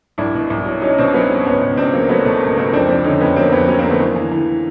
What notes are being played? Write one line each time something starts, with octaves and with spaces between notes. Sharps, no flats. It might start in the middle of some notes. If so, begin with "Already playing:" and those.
C2 D4 E4
B2
C2
F#3
F#3 C#4 D#4
B2 C4 D4
F#3 B3 C#4
C2
C#2 B3 C#4
C#2
C#2 C4 D4
F#3 A#3
F#3 A3 B3
B2 A3
C#2 A#3
C#2 A#3 C4
F2 C4 D4
F2 C4 D4
D3 C#4 D#4
F2 B3 C#4
F#3 A#3 C4
F2 B3 C#4
F#3 B3 C#4
A#3 C4
D3
A3 B3
E3 A#3
E3
E3